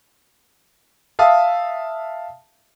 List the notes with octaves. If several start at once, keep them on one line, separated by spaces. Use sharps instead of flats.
E5 F5 A5 D#6